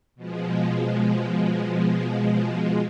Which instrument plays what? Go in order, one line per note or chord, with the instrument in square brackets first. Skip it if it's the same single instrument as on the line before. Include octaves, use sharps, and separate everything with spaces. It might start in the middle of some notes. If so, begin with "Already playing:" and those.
[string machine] B2 F3 G#3